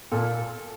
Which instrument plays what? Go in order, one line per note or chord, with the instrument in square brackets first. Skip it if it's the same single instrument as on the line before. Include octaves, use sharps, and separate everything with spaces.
[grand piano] A#2 [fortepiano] A4